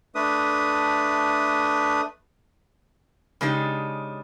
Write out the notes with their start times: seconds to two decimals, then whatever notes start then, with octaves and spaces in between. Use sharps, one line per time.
0.15 A3 D4 B4 D#6
3.41 C#3 G#3 D4 D#4 G4